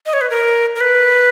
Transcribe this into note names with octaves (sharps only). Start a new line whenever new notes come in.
D#5
C#5
B4
A#4
A#4
B4